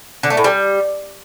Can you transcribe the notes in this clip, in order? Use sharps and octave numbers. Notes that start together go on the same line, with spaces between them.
D3
A3
A2
G3